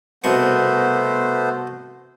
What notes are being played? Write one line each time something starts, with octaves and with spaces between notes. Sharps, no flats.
C2 B2 A3 B3 C5 C#6